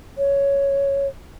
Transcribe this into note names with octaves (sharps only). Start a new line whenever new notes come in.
C#5